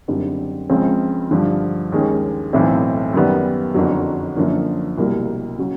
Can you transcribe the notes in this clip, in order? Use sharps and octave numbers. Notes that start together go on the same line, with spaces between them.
F#1 F#2 D3 G3 C4
C#2 C#3 F3 G#3 C4
G2 D3 F3
D#2 D#3 G#3 C#4
B1 A2 E3 A3 C4
F#2 D#3 G3 B3
F#1 F2 D3 F#3
F#2 D3 F3 A#3 C#4
C2 B2 G3 A#3
C#3 F#3